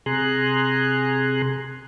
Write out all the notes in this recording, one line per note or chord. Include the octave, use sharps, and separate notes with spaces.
C3 G#4 G#5 A#5 C6 F#6